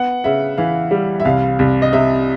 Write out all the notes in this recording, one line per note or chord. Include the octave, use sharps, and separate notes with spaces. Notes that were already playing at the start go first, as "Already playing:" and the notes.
Already playing: B3 F#5
C#3 E5
E3 F5
G3
E5
C2 F5
C2
D#5
C3 E5